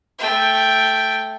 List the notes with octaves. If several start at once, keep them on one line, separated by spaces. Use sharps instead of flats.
A3 G5